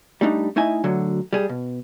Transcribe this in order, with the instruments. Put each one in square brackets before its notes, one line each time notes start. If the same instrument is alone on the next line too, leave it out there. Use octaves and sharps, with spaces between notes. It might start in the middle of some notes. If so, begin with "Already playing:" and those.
[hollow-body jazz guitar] G3 A3 D4 D#4
A3 D#4 E4 D#5 G#5
D2 D3 F#3
G3 G#4
B2